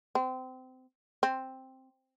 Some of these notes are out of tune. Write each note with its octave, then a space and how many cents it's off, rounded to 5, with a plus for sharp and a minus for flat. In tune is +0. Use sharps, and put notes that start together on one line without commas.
C4 -25
C4 +5